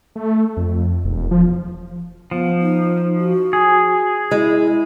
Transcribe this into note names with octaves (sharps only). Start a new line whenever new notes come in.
A3
F2
E1
F3
F3 B3
D#4
F#4
G#4
G#3 E4